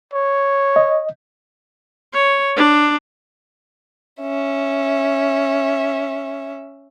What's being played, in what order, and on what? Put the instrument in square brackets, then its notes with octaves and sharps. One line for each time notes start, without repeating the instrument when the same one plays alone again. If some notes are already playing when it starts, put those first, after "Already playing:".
[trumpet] C#5
[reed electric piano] D#5
[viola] C#5
D4
[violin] C#4 E5